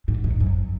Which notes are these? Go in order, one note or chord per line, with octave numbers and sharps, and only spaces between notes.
G#2
G#2
F#2